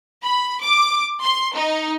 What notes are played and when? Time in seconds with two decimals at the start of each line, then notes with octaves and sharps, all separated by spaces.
0.23 B5
0.63 D6
1.24 C6
1.55 D#4